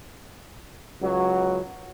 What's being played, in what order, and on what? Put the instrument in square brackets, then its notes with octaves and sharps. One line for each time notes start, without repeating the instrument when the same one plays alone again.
[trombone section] C#2 F#3